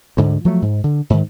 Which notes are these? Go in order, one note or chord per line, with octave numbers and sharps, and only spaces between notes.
D2 G#2 D3
F3 F#3 A3
G#2
D3
G#2 D#3